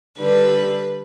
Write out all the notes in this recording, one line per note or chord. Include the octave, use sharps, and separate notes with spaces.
D3 G3 D4 B4